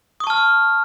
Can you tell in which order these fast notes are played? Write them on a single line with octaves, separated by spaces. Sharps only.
D#6 C#6 A5 F6